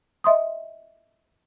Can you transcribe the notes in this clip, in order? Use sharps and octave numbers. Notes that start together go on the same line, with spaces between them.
D#5 E5 C6 D#6